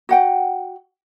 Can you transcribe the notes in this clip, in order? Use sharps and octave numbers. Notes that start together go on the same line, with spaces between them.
F#4 F#5 G5